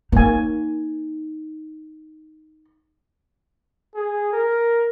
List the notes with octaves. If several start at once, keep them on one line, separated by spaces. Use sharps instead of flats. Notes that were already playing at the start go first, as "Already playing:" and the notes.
A#3 D#4 G#5
G#4
A#4